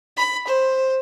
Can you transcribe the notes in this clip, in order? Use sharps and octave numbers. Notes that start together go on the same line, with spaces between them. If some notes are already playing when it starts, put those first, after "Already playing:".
B5
C5